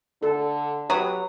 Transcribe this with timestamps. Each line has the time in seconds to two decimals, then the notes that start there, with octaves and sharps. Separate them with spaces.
0.23 D3 A4
0.90 F#3 G4 B4 D#6